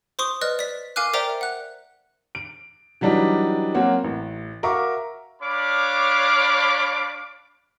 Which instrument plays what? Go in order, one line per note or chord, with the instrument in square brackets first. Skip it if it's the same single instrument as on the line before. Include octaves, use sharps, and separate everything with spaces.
[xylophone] C5 C6 C#6 D#6
B4 D5 D#5 F6 F#6
D5 B6
A#4 F5 G#5 D6 F6 F#6
A#4 C5 D5 E5 G5 A#5
F#5 F#6
[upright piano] D7
E3 F#3 G3 D4 D#4
F#3 A#3 C4 C#4 F#4
A1
F#4 A#4 E5 F5 C#6 D6
[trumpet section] D4 C#5 F5 B5 D6